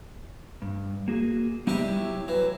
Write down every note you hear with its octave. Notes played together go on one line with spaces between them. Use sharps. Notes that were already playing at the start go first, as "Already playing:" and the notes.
G2
A#3 F#4 G#4
C3 G3 B3 D#4 G4
F#3 E4
E3 F#3